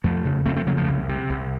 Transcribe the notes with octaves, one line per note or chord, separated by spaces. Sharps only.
F2 F3 A3
C#3
F2 A3 C4
A3 C4
C#3 F#3 A#3
F3 A3
C2
C3
C2